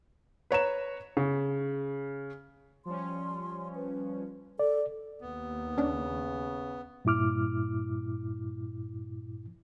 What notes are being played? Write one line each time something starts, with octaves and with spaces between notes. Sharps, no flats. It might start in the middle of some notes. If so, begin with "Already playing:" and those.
B4 C#5 A#5 E7
C#3
F3 G3 C#4 C6
B4
A4 D5
D#2 B3
C#3 C#4 D4
G2 A#2 E4 D6 F6